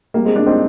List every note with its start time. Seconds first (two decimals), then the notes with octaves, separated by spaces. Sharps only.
0.14 G3 A#3
0.25 G#3 C4
0.36 A#3 D4
0.46 C4 D#4